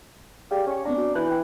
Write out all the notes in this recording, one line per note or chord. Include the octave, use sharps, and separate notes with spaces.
G4 G#4 D5 F5
C#4 G#5 C#6
B3 C4 D4 A#5
F#4
E3 G#5 F#6 G6
G5